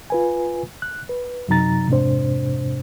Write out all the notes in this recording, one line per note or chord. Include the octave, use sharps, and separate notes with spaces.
F4 B4 G#5
F#6
B4
F#2 C3 F#3 D#4 A#5 A6
F2 G#2 C3 D4 C5